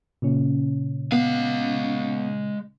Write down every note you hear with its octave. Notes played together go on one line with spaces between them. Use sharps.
A#2 C#3 C#4
G#3 B3 F5